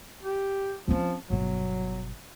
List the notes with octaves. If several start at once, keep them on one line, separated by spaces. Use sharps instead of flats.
G4
F3 C4 C#4
G1 B2 F#3